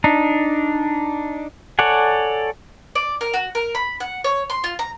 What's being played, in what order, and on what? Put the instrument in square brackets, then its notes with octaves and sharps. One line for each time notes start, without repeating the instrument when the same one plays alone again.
[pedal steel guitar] D4 D#4
A4 C#5 D5 F#5 G#5
[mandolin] D5
A#4
F#4
A#4
B5
F#5
C#5
C6
F4
A#5